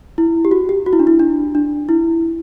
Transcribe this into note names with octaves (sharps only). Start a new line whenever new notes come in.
E4
G4
F#4
G4
F#4
E4
D4
E4
D4
D4
E4